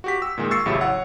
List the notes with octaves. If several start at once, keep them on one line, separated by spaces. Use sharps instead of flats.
F#4 G4 B6
E6
A#2 D#3 G#3
C#6 E6 A6 C7 C#7
A1 C#3 F#3 E4 G4 E5
C#5 F#5